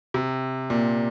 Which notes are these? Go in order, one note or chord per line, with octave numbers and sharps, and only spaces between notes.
C3
A#2